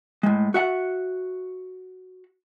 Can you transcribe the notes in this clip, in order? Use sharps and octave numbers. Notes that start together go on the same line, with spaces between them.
A2 G#3
F#4 E5 F#5